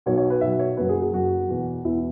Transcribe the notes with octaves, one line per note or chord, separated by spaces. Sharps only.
B1 B2 F#3 C#5
C#5
B4
B1 B2 F#3 E5
C#5
F#1 F#2 F#3 B4
G#4
G#4
F#1 F#2 F#3 F#4
E1 E2 B2
E1 E2 B2 E4